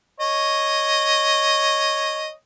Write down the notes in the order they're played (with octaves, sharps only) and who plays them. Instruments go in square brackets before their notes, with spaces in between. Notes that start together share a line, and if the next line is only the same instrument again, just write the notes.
[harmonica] C#5 D#5